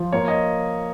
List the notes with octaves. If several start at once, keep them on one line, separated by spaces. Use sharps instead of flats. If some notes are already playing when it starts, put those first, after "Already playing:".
Already playing: F3
A#3 C#5
D#5